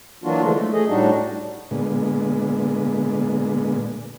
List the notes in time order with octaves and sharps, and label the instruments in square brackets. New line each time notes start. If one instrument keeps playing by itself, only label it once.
[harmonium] E3 F#3 A#3 D4 F4 F#4
D3 E3 F3 G#3 A3
A3
A3 G#4 D#5
A2 G3 D4 D#4 F#4
[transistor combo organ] A#2 D3 G#3 B3